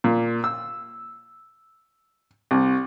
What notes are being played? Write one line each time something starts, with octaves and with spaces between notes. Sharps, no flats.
A#2
E6
C2